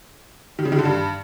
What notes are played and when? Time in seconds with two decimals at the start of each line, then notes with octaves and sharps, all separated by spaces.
0.59 D#3
0.65 C#3
0.72 D#3
0.79 D3
0.85 G2